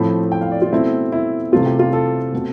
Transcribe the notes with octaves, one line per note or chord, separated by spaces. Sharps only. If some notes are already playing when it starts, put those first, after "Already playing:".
Already playing: A2 F3 A3 C4 B5
G5
F5
D5
F4
B2 A3 C4 E4
E4
C3 E3 A3 C4 F4
G4
F4
A4
B2 A3 C4